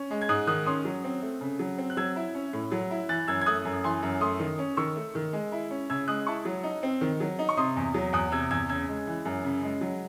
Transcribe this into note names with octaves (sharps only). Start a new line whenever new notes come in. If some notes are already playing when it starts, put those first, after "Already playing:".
Already playing: C#4
G#3
G#6
G#2 D#6 F#6
D#3 D#6 F#6
C#4 C6 D#6
F#3
C4
A3
C#3
F#3
C4
F#6
F#3 E6 G#6
E4
C#4
A2
F#3
E4
E3 F#6 A6
F#2 E6 G#6
G#6
A3 D#6 F#6
F#2
E3 G#5 C6
F#2
A3 C6 D#6
D#3
C#4
D#3 C#6 E6
A3
D#3
G#3
E4
C#4
C#3 E6 G#6
G#3 D#6 F#6
E4 A5 C#6
F#3
D#4
C4
D#3
F#3
D#4
C#6
C3 C6 D#6
E2
F#3
E2 D#6 F#6
C3 E6 G#6
E2 E6 G#6
C#3 E6 G#6
G#3
E3
F#2
C#3
G#3
F#3